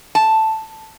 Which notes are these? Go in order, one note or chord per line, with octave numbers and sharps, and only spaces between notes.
A5